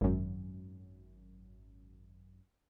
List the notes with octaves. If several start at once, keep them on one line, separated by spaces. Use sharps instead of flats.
G#1 F#2